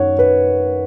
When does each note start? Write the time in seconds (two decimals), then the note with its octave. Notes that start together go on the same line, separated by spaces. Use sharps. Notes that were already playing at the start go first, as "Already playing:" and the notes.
Already playing: F#2 D#3 C#5 F#5
0.19 B4